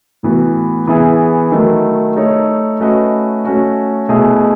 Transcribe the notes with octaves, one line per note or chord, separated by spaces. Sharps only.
A2 E3 B3 F#4
E3 B3 E4 G#4
D#3 F#3 A3 E4
A3 D#4 A4 C#5
A3 C#4 F#4 B4 D#5
A3 C#4 F#4
B2 A3 E4 G#4